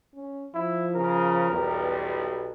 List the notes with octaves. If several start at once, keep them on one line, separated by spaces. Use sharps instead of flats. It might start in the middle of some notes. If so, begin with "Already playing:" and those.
C#4
F3 E4
C#3 A#4
B1 E2 G3